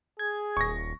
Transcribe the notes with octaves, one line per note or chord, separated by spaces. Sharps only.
G#4 G#6
D#1 C#6 A#6